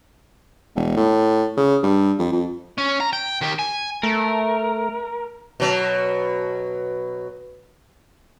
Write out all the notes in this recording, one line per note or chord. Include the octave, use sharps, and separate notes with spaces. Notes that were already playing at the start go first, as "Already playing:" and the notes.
E1
A2
C#3
G2
F2
F2
C#4
A#5
G5
D#3 G4
G#5
A3 A#4
B2 F#3